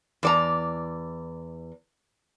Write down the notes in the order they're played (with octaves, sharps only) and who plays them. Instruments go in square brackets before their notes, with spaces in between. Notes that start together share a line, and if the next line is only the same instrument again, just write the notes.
[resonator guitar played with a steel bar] E2 D5 A#5